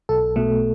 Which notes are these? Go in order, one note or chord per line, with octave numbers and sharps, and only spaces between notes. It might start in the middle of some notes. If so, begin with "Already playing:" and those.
B1 A4
B2 A3